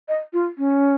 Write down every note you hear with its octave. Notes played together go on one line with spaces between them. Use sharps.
D#5
F4
C#4